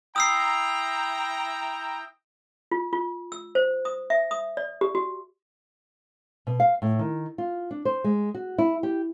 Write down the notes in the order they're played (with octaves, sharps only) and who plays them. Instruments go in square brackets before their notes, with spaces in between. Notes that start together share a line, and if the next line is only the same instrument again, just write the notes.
[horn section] E4 G5 A#5 [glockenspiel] D#6 E6 C7
[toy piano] F4
F4
E6
C5
D#6
E5
D#6
D5
G4
F#4
[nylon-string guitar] B2
F5
A2
D#3
F4
D4
C5
G#3
F#4
E4
G4